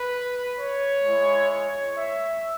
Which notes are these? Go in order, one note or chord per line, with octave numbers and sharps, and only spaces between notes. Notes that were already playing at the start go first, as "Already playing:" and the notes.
Already playing: B4
C#5
G#3 E4
C#5
E5